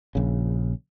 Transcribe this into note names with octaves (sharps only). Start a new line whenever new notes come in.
A#1 C#3